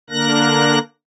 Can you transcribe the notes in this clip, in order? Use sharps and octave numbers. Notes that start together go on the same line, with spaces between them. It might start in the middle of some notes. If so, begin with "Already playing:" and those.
D3 A#3 D4 A#4 F#6 A#6